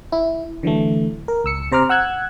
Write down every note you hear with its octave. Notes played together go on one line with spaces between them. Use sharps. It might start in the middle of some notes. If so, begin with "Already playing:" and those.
E4
D3 E3 F#3 A3
A#4
C#2 E6 C#7
C3 C5 A#5 D6 F6
F#5 E6 F#6 G#6